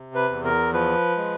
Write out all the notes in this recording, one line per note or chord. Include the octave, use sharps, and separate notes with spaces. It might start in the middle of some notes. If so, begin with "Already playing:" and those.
Already playing: C3
B4
E2
A#4
F3 B4
G#3